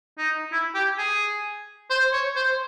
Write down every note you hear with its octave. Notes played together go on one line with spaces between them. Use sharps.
D#4
E4
G4
G#4
C5
C#5
C5